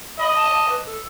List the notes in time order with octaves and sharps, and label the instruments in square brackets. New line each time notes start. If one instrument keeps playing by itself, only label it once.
[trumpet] D#5 [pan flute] B5
[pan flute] A5
A5
B4
A4